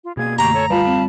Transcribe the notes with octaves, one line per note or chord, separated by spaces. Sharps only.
F4
B2 A#3 G#4 G#6
F#2 D3 A3 G4 A#5 C#6
A4 C#5
G3 F4 B4 F5 A5 B5
C4